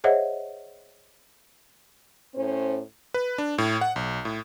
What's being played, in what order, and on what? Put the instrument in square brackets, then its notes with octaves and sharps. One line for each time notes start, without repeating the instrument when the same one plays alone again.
[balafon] G#4 C5 C#5 D#5 E5 F#5
[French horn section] A2 C#4 C5
[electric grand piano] B4
D4
A2
F#5
B1
A2